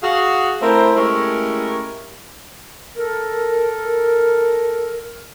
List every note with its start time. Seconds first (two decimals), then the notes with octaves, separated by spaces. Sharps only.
0.03 F#4 G#4 F5
0.62 A3 C4 E4 A#4 C5
0.96 G#3 A3 C#4 E4 G4 A#4
2.97 A4 A#4